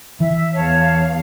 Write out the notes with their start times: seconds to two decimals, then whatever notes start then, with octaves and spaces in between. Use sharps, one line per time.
0.20 E3 E5
0.54 E2 C#5 F5 A5